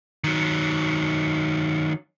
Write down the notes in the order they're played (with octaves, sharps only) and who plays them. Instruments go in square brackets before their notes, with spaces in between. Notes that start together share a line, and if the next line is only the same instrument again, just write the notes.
[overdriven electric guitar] D#3 F#3